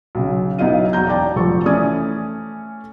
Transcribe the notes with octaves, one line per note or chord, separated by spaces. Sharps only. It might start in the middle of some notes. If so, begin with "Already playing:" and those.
B1 C#3
B1 B3 D#4 E4 F5 D#7
E1 F#4 A#5 G6
D5 G5 A5 A#5 D6
F1 F3 A4 C#6
E3 A3 C#4 D5 D#6 G#6